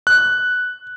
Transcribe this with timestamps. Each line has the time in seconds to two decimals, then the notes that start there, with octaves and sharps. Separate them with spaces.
0.07 F#6